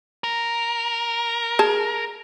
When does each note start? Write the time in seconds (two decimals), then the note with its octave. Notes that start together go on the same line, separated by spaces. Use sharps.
0.24 A#4
1.59 G#4 A5